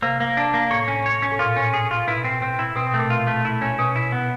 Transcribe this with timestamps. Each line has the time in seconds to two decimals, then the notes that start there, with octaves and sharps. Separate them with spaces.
0.02 C3 A#3
0.20 A#3
0.37 D4
0.54 A#3
0.71 A2 C#5
0.88 C#4
1.06 C#5
1.22 C#4
1.31 A2
1.39 A#2 F4
1.56 C#4
1.74 G#4
1.91 F4
2.07 B2 E4
2.24 C4
2.42 C4
2.59 E4
2.76 B2 C4
2.87 B2
2.94 A3
2.99 A#2
3.10 F4
3.27 A3
3.45 E4
3.61 C#4
3.79 B2 C#4
3.96 E4
4.12 B3